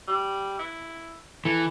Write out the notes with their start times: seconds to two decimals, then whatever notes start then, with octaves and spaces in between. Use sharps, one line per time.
0.07 G3
0.59 E4
1.45 E3 A4